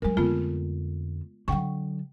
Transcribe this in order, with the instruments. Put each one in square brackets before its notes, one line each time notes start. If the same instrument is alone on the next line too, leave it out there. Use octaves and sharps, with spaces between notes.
[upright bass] G2 F#3 [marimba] G#3 A#4
[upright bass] F2 D3 [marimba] A3 B3 F4
[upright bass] D3 F#3 [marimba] F#5 G5 C#6